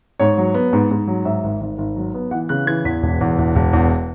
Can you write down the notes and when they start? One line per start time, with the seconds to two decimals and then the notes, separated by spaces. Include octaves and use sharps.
0.20 G#2 C#5
0.38 F#3
0.54 B3
0.73 G#2
0.91 G#2
1.07 F#3
1.25 G#2 E5
1.44 G#1
1.61 G#1
1.78 G#1
1.96 F#3
2.14 B3
2.31 E3 F#5
2.49 C#3 F#6
2.67 E3 G#6
2.85 E2 B6
3.03 E1
3.21 E2
3.38 E1
3.56 E1
3.73 E2